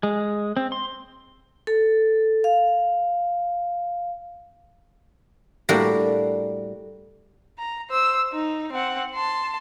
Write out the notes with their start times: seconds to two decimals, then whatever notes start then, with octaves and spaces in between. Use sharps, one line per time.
0.03 G#3
0.57 C4
0.72 C6
1.67 A4
2.44 F5
5.69 A2 G3 A#3 D4 F#4 G4
7.58 A#5
7.90 C5 E6
8.32 D#4
8.72 C4 F#5
9.14 A5 C6